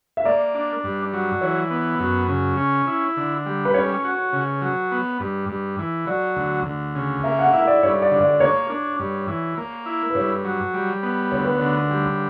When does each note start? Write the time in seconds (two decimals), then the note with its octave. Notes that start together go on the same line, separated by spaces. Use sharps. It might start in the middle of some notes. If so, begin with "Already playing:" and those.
0.17 E5
0.25 A#3 D5
0.55 D4
0.84 G2
1.13 F#3
1.41 E3 C#5
1.70 B3
2.00 F#2
2.28 C#3
2.58 C#4
2.87 E4
3.17 D3
3.46 G3
3.65 B4
3.74 C#4 C#5
4.04 F#4
4.33 C#3
4.62 F#3
4.91 B3
5.20 G2
5.49 G2
5.79 E3
6.07 F#3 D5
6.36 D2
6.65 D2
6.95 C#3
7.24 A#3 E5
7.39 F#5
7.53 E4 E5
7.67 D5
7.83 G2 C#5
8.02 D5
8.11 D3
8.21 D5
8.40 A#3 C#5
8.70 D4
9.00 G2
9.28 E3
9.57 A#3
9.86 E4
10.10 B4
10.15 G2 C#5
10.44 F#3
10.74 G3
11.03 B3
11.32 D2 C#5
11.44 B4
11.56 D3 C#5
11.90 G3